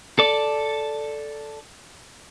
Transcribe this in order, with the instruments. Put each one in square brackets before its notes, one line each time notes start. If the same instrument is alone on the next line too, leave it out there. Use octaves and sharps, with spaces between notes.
[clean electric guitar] A4 D5